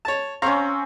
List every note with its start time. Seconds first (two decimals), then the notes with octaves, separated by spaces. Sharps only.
0.05 C#5 A5
0.42 C4 C#4 F5 A#5 C#6